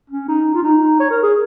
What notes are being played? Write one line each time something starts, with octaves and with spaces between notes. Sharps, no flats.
C#4
D#4
F4
D#4
C#5
A#4
G#4